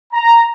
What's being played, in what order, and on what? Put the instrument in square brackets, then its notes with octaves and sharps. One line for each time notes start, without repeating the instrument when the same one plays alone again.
[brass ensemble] A#5